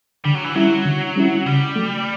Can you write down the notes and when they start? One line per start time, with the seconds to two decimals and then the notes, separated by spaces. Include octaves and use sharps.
0.25 D3 G3
0.35 F#3
0.44 E3
0.54 F#3 G3 C#4 E4
0.85 D3
1.16 G3 C#4 E4
1.46 C#3 G3
1.76 F#3 A3